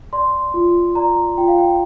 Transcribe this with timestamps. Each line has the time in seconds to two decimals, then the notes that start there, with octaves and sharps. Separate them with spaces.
0.13 D5 C6
0.54 F4
0.95 D5 A#5
1.38 F4 G5
1.48 F5
1.58 G5